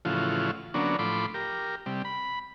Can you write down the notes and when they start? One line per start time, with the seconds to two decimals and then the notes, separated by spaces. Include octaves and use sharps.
0.05 A2 C#3 E3 F3 F4 F#4
0.74 D3 F#3 A#3 B3 C#4 D4
0.99 A2 F3 B5 C6 D6
1.34 G4 A#4
1.86 C3 G3
2.05 B5